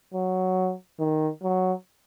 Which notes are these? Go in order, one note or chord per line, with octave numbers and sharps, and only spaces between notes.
F#3
D#3
F#3